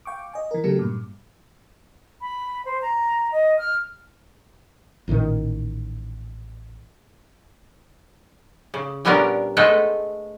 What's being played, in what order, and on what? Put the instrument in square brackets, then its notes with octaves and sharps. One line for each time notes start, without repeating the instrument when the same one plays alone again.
[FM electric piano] F5 G5 C#6 D6
D#5 G#5
E3 A#4
C#3 F#3 A3 G4 A4 A#4
G2 A#2
[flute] B5
C5
A#5
D#5
F6
[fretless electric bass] A1 A#2 D3 D#3
[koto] C#3
A#2 G3 B3 C#4 D4 A#4
G#3 A3 B3 A4 B4 C5